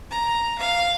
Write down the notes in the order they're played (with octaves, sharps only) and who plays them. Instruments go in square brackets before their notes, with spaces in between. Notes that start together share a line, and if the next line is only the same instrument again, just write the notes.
[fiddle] A#5
F5